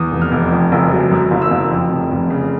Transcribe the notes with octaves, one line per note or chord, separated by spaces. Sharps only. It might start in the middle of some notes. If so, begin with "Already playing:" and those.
Already playing: E2 D#6
F1
F6
F1
F2
F#1
F#3
F#2
F#1
E6
F#1
F2
F1
F1
C#3